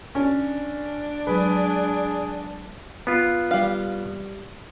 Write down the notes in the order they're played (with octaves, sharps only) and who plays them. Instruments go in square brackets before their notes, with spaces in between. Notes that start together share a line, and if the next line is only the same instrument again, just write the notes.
[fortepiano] C#4 [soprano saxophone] D4
[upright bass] F#3 G#3 [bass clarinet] G#4 [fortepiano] B4
[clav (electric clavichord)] B3 F4
[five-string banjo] G3 F5